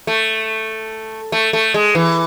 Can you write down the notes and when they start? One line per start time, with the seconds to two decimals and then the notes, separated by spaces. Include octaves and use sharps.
0.07 A3
1.32 A3
1.53 A3
1.74 G#3
1.95 E3